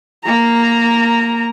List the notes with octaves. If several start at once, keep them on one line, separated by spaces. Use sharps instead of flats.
A#3 A#5